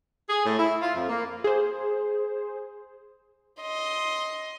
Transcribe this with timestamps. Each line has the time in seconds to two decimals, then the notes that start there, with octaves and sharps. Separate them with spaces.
0.30 G#4
0.46 A2
0.59 E4
0.82 F4
0.96 F2
1.09 A#3
1.44 G#4 C5
3.61 D#5 C6